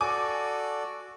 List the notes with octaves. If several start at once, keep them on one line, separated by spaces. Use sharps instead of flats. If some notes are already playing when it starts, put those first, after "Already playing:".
F#4 A4 D5 G#5 D6